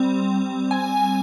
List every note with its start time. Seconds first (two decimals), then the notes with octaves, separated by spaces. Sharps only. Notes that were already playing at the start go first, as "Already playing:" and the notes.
Already playing: G3 C4
0.71 G#5